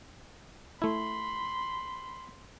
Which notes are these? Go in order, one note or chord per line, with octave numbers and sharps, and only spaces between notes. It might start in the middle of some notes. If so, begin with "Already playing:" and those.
A3 E4 B5 C6